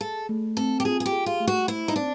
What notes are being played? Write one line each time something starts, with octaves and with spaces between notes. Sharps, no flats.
G#4 A4
A3
C4 A4
G4
F4 G#4
G#4
G4
G#4
F4
A3
F#4
E4 C5
D#4
C4 D4